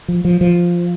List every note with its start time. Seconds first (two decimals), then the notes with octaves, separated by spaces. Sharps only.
0.08 F3
0.25 F3
0.41 F3